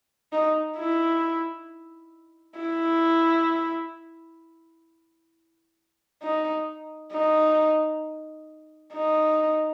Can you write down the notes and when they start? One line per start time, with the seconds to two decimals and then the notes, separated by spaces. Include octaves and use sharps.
0.32 D#4
0.78 E4
2.59 E4
6.23 D#4
7.13 D#4
8.94 D#4